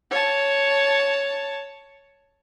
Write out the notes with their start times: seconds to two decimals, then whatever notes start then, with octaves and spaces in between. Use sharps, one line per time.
0.11 C#5 A5